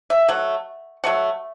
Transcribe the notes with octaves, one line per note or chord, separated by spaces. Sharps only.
E5
F#3 A3 F#5
F#3 A3 F#5